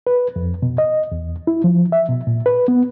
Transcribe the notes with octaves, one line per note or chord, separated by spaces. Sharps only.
B4
F2
B2
D#5
E2
E4
F3
E5
B2
A#2
B4
B3